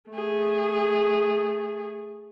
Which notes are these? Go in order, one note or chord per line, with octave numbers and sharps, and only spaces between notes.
A3 G#4